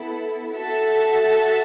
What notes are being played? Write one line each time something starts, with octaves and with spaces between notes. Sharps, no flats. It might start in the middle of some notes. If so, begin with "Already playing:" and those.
Already playing: B3 E4 A4
F#4 A4 E5 A5